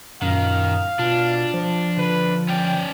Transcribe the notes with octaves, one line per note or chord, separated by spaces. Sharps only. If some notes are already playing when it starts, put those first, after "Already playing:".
F#2 A#2 D#3 F5
B2 D4 F4
F3 C5
D3 B4
C#4 D5 G5